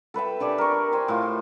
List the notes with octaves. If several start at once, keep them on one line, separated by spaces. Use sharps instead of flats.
A4 B4 E5 G5
D4 G4 D5 G#5
A#4 C#6
C5 G5 G#5
A2 F4